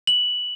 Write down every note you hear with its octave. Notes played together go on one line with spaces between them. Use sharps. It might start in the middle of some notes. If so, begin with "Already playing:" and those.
F#7